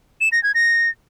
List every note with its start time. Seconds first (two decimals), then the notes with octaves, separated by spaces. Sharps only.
0.21 E7
0.32 A#6
0.43 G#6
0.55 A#6